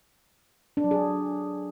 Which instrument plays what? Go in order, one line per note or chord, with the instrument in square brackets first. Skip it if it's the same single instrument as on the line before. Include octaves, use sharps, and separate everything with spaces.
[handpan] D4
F#3
G#4